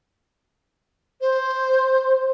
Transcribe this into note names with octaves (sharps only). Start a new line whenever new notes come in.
C5